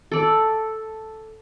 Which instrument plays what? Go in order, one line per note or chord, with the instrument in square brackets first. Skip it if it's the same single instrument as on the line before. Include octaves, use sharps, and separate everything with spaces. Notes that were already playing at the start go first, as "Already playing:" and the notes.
[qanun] A4 D5